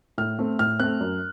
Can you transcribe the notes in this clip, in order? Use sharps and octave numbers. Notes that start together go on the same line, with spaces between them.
A2 F6
A3 C4
A2 F6
A3 C4 F#6
F#2